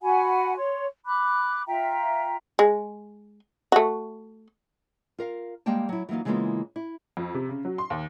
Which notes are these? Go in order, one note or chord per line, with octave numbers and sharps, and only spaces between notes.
F#4 F#5 G#5 B5
C#5 C6
B5 D6 F#6
F4 E5 G5 A#5
G#3
A3 F#4
F4 A#4 F5
G3 G#3 A#3 G5 A5
F#3 E4
E3 F#3 A#3 D#4 F4
C#3 E3 G#3 A#3 B3 F4
E4
F2
C3
C#3
F#3
C6
D#2